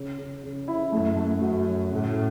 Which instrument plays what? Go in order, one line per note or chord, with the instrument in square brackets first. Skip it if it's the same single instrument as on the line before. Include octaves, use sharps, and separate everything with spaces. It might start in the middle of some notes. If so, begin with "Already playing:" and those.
Already playing: [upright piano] C#3 C#4
C#3
C#3
E4
[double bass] F#2 [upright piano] A3
[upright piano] A3
[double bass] F#2 [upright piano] F#4
[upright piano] F#3
[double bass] A2 [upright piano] C#3